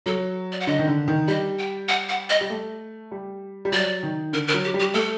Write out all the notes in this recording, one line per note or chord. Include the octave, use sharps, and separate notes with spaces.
F#3 A4
D5
F#5
D3 D#5
D#3
D3
D#3
G3 D#5
G5
F#5
F#5
D#5
G3
A3
G3
G3
F#3 D5
D#3
D3 A#4
A#4
F#3
G4
G3
G4
A3 A4